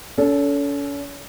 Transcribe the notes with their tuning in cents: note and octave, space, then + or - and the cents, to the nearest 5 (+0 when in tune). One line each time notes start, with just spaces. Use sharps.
C#4 +40 A4 +0